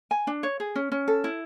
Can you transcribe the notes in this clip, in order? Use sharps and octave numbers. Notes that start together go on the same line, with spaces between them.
G#5
D4
C#5
G#4
C#4
C#4
A4
E4